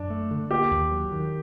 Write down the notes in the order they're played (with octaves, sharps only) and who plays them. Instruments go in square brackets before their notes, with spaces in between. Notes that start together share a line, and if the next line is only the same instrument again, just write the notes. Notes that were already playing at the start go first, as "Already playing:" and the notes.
Already playing: [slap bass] F#2 [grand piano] D4
[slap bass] A3
D3
[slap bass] A#3 [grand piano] G4
[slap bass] D#2
F#3
D#3